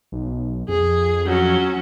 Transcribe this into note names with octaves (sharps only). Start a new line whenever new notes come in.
B1
F2 G#4
F#3 C#4